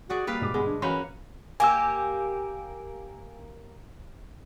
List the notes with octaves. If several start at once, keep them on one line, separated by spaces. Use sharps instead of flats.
F#4 G#4 D5 F#5
G3 A#3 B4 F5
G#2 B2 D6
G1 G#3 B3 G#4
D4
E3 A#3 C#4 F#4 B5 F#6
A#3 G4 G#5 E6